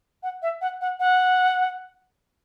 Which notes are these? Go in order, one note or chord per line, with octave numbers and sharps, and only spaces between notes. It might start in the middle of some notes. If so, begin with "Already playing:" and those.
F#5
E5
F#5
F#5
F#5